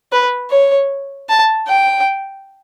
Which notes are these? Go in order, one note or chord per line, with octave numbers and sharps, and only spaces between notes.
B4
C#5
A5
G5